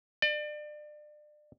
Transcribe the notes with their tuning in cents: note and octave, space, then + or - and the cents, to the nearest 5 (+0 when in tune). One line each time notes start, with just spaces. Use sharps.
D5 +30